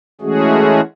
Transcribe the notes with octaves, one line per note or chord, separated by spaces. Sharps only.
E3 G#3 A3 C#4 F#4 G#4